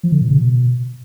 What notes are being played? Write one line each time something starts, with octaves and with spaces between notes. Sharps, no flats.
F3
D3
A#2
C#3
B2